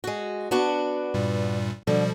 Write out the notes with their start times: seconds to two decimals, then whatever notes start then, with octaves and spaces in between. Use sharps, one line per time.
0.04 G#3 F#4
0.51 B3 D4 F#4
1.14 G2 A#2 G3
1.87 B2 D3 F3 G3